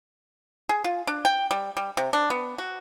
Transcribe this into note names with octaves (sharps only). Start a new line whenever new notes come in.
G#4
F4
D4
G5
G3
G3
C3
D4
B3
F#4